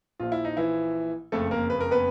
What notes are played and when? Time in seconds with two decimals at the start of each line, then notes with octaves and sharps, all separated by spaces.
0.20 A#1 A#2 F3 F4
0.32 E4
0.44 D#4
0.57 E3 E4
1.32 F#1 F2 C#3 A3 A4
1.51 A#3 A#4
1.70 B4
1.80 A#4
1.91 B3 B4